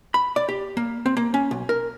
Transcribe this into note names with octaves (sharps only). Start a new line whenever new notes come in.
B5
D5
G4
A#3
C4
A#3
C#4
B1
A#4